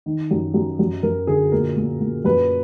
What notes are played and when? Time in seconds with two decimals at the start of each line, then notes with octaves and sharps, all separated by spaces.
0.06 D#3
0.31 F#2
0.54 F#2
0.79 F#2
1.03 F#2 A#4
1.27 D3 G#4
1.52 A#2 A#4
1.77 A#2
2.00 A#2
2.25 F#2 B4